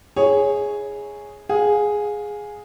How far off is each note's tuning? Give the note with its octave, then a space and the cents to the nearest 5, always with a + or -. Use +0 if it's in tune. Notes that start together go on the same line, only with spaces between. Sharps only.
E4 -35 G#4 +0 C#5 +0
G#4 +0 F5 +30